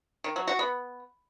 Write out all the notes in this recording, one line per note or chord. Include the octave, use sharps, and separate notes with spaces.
D#3
F#3
F#4
B3